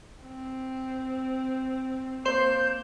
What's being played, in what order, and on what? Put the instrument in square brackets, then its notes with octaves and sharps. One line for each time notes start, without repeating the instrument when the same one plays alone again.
[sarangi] C4
[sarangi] A#3 [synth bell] C5 C6 E7 [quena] G6